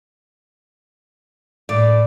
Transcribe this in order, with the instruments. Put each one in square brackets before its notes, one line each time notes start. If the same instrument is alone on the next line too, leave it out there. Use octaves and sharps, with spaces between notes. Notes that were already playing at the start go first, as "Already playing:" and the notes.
[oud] A2 [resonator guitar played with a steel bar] D5